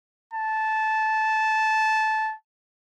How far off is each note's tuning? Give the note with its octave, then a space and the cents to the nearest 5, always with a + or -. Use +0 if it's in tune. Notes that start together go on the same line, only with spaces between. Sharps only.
A5 -15